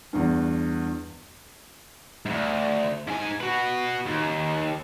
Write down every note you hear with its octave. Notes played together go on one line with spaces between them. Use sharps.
E2 G2
D2 G#2
G#2 G#5
F#4 B4
D#2